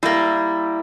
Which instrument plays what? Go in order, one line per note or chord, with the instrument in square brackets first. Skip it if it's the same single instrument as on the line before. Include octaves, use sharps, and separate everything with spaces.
[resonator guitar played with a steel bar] G3 A#3 [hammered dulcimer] E4